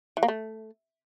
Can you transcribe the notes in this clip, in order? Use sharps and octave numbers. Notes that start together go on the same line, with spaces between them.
E3
A#3
A3